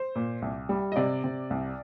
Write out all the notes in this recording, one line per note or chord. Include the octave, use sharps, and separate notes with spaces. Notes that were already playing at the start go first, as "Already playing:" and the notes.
Already playing: C5
A#2
C2
G3
D#5
C3 D5
C3
C2